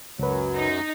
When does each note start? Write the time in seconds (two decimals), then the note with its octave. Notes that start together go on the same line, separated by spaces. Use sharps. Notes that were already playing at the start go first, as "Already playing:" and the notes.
0.19 C#2 F#2 F#3 B4
0.56 D#4